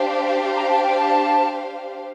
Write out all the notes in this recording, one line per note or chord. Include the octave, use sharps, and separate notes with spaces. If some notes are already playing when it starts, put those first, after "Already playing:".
Already playing: D4 G4 C5 F5
A#5
A5
G5
A5